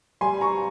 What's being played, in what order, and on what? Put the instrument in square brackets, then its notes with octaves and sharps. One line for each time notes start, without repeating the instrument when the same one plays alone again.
[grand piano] G3 G#5 C6
A#5 C#6